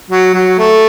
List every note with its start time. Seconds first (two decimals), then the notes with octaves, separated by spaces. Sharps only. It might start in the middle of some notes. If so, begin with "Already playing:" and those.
0.10 F#3
0.34 F#3
0.58 A3